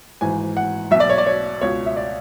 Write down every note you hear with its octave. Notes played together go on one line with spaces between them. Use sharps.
G#1 G#2 E3 G#5
F#5
B1 B2 E5
D5
C#5
D5
C#5
C#2 B2 C#5
E5
D5